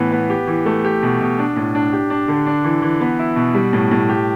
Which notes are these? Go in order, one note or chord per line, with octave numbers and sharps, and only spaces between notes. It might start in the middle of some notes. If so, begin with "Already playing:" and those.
Already playing: A2 E3 B3
B3
G4
E3
A3
G4
B2
B2
D4
A2
D4
G4
D4
D3
D4
E3
E3
B3
E4
B2
G3
A2
A2
G4